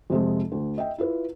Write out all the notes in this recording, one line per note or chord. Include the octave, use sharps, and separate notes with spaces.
F2 C3 G#3
D2
D#5 E5 G5
E4 F4 B4